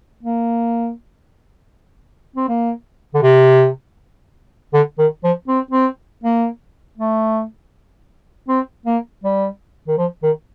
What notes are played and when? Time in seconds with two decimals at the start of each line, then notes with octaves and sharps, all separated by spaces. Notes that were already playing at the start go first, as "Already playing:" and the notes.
0.23 A#3
2.36 C4
2.48 A#3
3.14 D3
3.23 C3
4.74 D3
4.99 D#3
5.24 F3
5.48 C4
5.71 C4
6.24 A#3
6.98 A3
8.48 C4
8.86 A#3
9.24 G3
9.88 D#3
9.98 F3
10.23 D#3